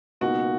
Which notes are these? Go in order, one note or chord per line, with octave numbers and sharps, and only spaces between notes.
C#2 B2 A#3 D#4 F#4 A#4